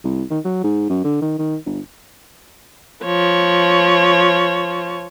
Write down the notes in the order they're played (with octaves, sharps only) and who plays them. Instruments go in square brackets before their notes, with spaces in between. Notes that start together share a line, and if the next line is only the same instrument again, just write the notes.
[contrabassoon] C2
D#3
F#3
G#2
F#2
D3
D#3
D#3
G1
[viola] F3 C#5